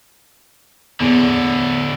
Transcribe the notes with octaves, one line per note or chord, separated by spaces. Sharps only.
E2 A2 D3